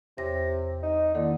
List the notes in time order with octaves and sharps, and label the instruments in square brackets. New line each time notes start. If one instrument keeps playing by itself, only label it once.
[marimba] E2 C#5 A#6 [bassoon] C3
[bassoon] D#4
[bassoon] D3 [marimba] D#3 A#3 E4